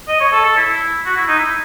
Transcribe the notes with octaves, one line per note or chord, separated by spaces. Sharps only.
D#5
C#5
A4
A4
E4
F#4
E4
D#4
E4